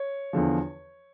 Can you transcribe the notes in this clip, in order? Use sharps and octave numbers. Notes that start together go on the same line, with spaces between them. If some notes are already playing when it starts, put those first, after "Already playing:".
Already playing: C#5
E2 D3 F3